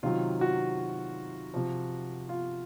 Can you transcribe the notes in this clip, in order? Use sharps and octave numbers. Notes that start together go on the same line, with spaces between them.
C3 D#3 F#3 F4
F#4
C3 F3
F4